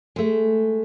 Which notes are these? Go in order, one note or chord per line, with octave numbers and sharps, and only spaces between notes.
G#3 A3